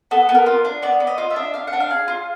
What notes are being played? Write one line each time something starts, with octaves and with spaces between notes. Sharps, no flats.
B3 A4
B3
A#4
F4
D4
B3 D5
B3
D#5
F4
E5
D4
D4 F5
F#5
D4
F5
G#4
F4